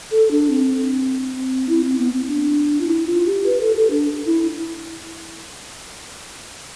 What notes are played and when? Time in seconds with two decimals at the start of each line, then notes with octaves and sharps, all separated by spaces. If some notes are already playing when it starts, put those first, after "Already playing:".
0.11 A4
0.31 D4
0.50 C4
1.69 E4
1.84 C4
1.98 B3
2.14 C4
2.28 D4
2.81 F4
2.87 E4
3.06 F4
3.26 G4
3.46 B4
3.61 A4
3.76 A4
3.90 D4
4.26 E4